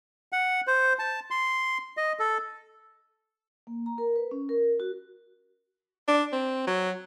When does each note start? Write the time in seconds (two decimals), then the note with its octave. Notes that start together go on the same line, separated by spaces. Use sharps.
0.32 F#5
0.67 C5
0.99 A5
1.31 C6
1.97 D#5
2.19 A4
3.67 A#3
3.86 A#5
3.98 A#4
4.16 B4
4.31 C#4
4.49 A#4
4.80 F#4
6.08 D4
6.33 C4
6.67 F#3